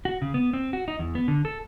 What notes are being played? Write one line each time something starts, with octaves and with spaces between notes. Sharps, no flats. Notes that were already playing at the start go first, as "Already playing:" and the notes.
F#4
C#3
B3
C4
F#4
D#4
E2
B3
D3
A4